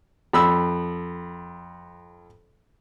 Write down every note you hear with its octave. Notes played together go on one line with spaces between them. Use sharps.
F2 B5 E6